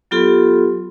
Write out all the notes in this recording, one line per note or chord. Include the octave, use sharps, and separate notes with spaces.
F#3 B3 F4 G4 A4 C6